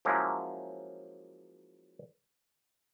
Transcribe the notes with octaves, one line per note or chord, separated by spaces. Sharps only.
F3 F#3 G#3 A#3 C#4 E4